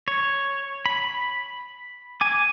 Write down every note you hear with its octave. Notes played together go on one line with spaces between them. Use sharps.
C#5
B5
G#5 D6